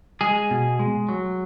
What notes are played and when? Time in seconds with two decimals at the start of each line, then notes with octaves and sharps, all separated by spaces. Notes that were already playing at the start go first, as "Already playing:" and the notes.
0.21 G#3 G#4
0.51 B2
0.79 G#3
1.09 F#3